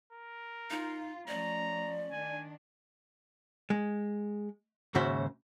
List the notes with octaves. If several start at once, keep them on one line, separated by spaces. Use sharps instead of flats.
A#4
D#4 F4
F3 A3 C#4 D5 A#5
D#3 D4 G#5
G#3
D#2 G#2 C#3 F#4 C5 E5